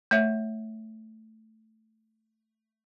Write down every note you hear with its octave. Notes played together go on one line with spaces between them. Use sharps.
A3 C#5 E5